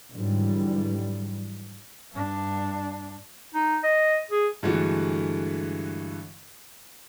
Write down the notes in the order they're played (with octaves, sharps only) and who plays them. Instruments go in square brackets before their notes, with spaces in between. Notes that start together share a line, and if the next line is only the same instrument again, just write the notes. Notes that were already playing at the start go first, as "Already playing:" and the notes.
[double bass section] G#2 D3 E3 F#3 G3
[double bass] G2 D4
[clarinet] D#4
D#5
G#4
[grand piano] G2 D3 E3 G#3 A3 F#4